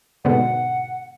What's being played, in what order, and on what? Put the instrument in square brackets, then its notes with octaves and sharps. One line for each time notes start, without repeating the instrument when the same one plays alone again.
[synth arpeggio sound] G#2 B2 D3 [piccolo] F#5